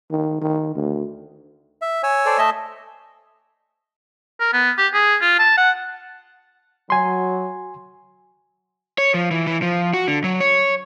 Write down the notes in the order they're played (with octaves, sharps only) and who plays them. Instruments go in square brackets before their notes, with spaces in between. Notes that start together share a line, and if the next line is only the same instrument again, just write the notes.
[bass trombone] D#3
D#3
D2
[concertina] E5
C#5 G#5 E6
[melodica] A4 C5 D5
A3 D#5 E5
[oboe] A#4
B3
G4
G#4
F4
A5
F#5
[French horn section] F#3 [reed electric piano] G#5 C6
[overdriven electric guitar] C#5
F3
E3
E3
F3
F#4
D3
F#3
C#5